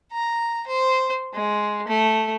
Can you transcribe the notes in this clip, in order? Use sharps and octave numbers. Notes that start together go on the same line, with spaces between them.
A#5
C5
G#3
A3